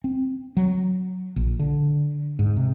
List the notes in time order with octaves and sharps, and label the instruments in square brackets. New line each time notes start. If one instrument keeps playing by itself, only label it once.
[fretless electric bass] C4
F#3
A#1
D3
G#2
C3